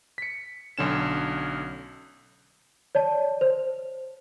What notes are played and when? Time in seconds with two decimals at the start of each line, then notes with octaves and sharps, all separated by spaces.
0.18 B6 C#7
0.78 B1 D3 C#4 E7
2.95 C#5 D5 A5
3.41 C5